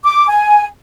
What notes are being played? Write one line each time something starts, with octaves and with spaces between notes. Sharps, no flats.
D6
G#5